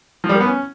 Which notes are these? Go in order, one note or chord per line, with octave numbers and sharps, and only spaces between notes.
F3
G3
A#3
B3
C#4